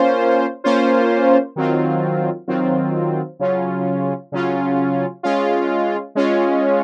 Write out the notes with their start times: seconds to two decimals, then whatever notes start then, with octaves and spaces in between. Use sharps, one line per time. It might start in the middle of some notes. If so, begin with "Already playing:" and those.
Already playing: A#3 C#4 F4 C5
0.64 A#3 C#4 F4 C5
1.56 D#3 F#3 C4 F4
2.48 D#3 F#3 C4 F4
3.39 C#3 F#3 C#4 F4
4.32 C#3 F#3 C#4 F4
5.23 G#3 C#4 F4
6.15 G#3 C#4 F4